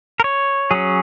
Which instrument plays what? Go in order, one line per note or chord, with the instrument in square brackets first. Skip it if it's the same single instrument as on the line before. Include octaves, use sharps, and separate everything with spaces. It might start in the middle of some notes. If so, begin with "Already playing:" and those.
[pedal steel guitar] A#4
C#5
F#3 C#4 G#4